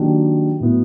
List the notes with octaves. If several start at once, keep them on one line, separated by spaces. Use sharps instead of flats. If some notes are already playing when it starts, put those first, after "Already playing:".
Already playing: D#3 F#3 A#3 D4 G4
A2 F#3 B3 E4